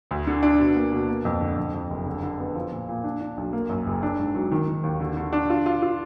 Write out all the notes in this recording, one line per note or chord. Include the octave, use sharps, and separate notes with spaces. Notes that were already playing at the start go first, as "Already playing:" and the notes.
D2
D3
D4
B2
A#3
B2
A#3
F2
D3
F2
F2
F#1
D3
D3
B3
F3
A#2
A#2
D4
D4
B1
A#3
F#2
F#1
D4
G#2
F#3
D#3
D#3
D#2
D3
D3
D4
F4
F4
F4